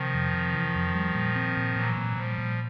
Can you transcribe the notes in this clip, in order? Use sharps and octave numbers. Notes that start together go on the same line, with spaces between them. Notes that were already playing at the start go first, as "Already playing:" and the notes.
Already playing: C3 D#3 F3
F2
C3
E3
F2
G3
A#2
C4
A#2
A#2 E3 F#3
A#2
A#2 F3 G3
A#2